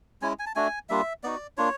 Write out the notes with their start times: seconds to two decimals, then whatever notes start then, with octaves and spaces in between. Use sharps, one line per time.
0.22 G#3 C#4 E4 G#5
0.39 G#5
0.46 A5
0.55 A3 D4 F#4 G#5
0.89 G3 A#3 D4 F4 E5
1.23 B3 D#4 F#4 D5
1.57 A#3 D4 F4 C#5